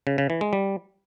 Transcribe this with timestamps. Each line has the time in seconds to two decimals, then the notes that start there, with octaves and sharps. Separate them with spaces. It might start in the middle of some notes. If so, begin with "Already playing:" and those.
0.07 C#3
0.18 C#3
0.30 E3
0.41 G#3
0.53 G3